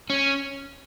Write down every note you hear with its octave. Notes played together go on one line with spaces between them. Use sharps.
C#4